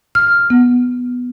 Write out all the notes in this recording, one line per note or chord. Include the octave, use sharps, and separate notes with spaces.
F6
B3